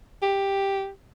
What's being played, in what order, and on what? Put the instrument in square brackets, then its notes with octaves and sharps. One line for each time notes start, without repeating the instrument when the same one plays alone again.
[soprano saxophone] G4